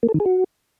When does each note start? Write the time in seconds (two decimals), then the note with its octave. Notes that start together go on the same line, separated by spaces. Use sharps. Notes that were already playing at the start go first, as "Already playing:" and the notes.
0.03 A#3
0.09 A4
0.14 D#3
0.20 G#4
0.26 F#4